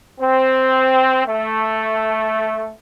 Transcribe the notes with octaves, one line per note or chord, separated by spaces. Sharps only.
C4
A3